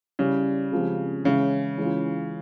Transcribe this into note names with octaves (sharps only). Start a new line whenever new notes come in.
C#3 G3 C#4 E4
C#3 F3 G#3 C4 G4
C#3 E3 G#3 C#4 E4
E3 G#3 C#4 F4